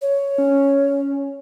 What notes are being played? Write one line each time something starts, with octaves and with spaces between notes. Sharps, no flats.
C#5
C#4